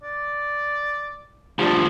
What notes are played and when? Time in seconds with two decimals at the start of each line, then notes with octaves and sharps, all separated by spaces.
0.03 D5
1.59 D2 F3 G3 D4